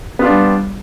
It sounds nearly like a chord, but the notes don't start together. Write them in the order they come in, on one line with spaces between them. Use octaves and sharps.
B3 F4 D4 G3